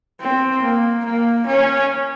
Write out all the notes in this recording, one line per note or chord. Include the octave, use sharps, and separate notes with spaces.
C4
A#3
A#3
C#4